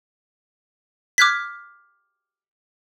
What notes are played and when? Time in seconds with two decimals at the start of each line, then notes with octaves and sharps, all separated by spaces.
1.18 D6 F6 F#6 G#6 B6